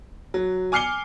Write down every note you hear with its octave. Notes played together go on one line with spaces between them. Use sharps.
F#3
G#5 D6 F6 C7 C#7 G7